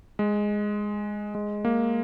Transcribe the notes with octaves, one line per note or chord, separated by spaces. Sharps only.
G#3
G#3
A#3